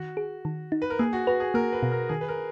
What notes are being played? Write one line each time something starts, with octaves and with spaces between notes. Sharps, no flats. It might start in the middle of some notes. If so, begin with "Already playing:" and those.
Already playing: D#3 F#4
G#4
D#3
D#4
B4
A#4
A#3 G#4
F#4
F#4 B4
G#4
A#3 A#4
B4
B2
A#4
D#3 G#4
B4
A#4